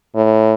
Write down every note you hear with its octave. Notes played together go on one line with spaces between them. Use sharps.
A2